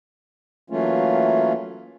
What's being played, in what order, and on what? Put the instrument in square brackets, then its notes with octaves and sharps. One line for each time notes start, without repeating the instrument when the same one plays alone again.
[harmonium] E3 F#3 A3 A#3 C#4 F4